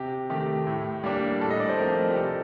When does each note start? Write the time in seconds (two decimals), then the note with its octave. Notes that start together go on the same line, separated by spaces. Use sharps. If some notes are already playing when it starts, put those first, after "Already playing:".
Already playing: C3 G4
0.30 D#3 A3 G4
0.67 A2
1.04 G3 A#3 D4
1.41 A2 A4
1.50 D#5
1.60 D5
1.69 C5
1.78 F3 A3 C4 A#4
2.10 G4
2.15 C3 A4